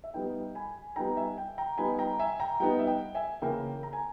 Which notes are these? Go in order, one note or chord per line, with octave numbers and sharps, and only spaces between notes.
E5
G3 B3 D#4 G5
G#5 B5
G3 B3 D#4 G5 A#5
E5 G#5
G5
G5 A#5
G3 B3 D#4 G#5 B5
G5 A#5
E5 G#5
G5 A#5
G3 B3 D#4 G5
E5
G5
E5 G#5
C#3 E3 A#3 E4 G5
A#5
G#5